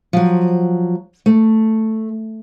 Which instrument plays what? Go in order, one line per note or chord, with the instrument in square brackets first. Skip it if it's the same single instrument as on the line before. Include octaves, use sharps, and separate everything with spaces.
[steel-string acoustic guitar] F3 F#3
A3